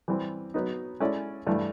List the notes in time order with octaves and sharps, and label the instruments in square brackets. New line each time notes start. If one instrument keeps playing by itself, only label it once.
[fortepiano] E3 G3 C4
F#3 B3 D#4
G#3 C#4 E4 A4 D5
G2 E3 A3